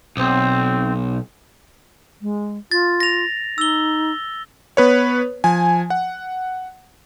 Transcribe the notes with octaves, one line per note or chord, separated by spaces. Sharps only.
B1 C4
G#3
F4 A6
A#6 F7
D#4 E6 G7
B3 B4 C#5
F3 G#5
F#5